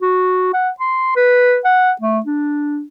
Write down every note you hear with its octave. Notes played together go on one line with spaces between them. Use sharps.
F#4
F#5
C6
B4
F#5
A3
D4